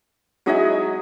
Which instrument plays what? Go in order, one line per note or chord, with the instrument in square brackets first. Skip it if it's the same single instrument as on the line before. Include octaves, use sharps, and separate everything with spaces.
[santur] F#3 D#5 G#5 [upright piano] G#3 D#4 E4